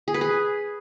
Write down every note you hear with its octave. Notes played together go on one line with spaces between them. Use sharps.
G#4
B4
G#4